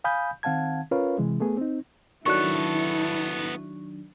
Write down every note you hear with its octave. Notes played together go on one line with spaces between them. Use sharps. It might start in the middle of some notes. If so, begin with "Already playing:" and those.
F5 G#5 B5 D#6 G6
D#3 C4 F5 F#5 A5 G#6
C#4 F4 A#4 B4 C#5 F5
C3 E3 G#3
A3 B3 G#4
C4 D#4
D#3 F#3 B3 D4 E4 A4 C#6 F#6